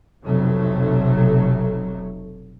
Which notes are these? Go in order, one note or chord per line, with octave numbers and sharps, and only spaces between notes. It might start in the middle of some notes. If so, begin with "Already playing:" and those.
F1 B1 F#3 A3